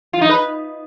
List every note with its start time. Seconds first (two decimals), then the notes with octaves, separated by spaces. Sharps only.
0.13 F4
0.21 D#4
0.29 B4